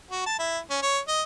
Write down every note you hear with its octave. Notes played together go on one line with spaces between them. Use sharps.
F#4
A5
E4
C#4
C#5
D#5